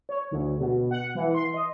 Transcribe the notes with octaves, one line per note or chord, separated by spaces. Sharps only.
C#5
D2
B2
F#5
E3
C6
D#5